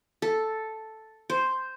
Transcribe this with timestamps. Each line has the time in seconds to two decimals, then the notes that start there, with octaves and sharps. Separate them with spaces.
0.22 A4
1.30 C5